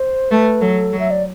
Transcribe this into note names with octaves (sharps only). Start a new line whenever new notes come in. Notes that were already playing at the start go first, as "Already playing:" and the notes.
Already playing: C5
A3 B4
F#3 A4
F#3
E5
D5